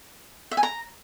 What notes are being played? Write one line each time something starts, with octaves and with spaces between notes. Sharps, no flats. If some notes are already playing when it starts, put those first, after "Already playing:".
E5
G#5
A#5